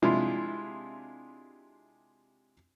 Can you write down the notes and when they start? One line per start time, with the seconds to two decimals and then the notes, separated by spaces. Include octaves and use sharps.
0.02 C3 G#3 D4 E4 F4